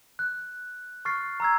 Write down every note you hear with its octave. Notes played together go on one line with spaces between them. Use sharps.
F#6
C#6 F6 A6 C7
A#5 E6 G#6